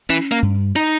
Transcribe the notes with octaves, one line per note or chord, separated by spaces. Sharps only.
E3 C#4
A#3
G2
D#4